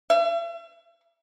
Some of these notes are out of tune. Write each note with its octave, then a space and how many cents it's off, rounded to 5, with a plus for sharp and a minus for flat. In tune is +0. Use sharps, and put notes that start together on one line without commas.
E5 +45